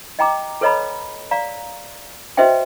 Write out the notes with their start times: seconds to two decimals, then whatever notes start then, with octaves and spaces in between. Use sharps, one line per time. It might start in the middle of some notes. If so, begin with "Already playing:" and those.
0.19 D#5 G5 A#5 D6
0.61 A4 B4 C#5 D#5 A#5 B5
1.31 D5 F5 A#5
2.37 F#4 B4 C5 D#5 E5 G5